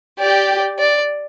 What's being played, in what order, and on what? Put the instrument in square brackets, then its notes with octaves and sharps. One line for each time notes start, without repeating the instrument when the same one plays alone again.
[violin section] G4 [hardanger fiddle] D5
[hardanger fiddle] D5